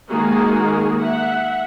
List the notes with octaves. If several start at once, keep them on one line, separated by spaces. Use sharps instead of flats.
D#3 G#3 A#3 F#4 G#4 A#4
E5 F#5